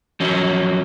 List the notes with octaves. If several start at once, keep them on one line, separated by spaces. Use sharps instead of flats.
F3 F#3 C#4